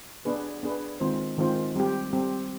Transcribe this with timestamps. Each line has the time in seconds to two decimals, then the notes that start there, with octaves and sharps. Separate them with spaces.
0.25 B3 D4 G#4 B4
0.63 B3 D4 G#4 B4
1.00 D#3 G#3 C4 F4 C5
1.38 D#3 G#3 C4 F4 C5
1.76 G3 C4 G4
2.13 G3 C4 G4